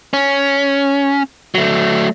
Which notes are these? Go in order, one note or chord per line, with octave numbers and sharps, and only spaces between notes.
C#4
F#3 A3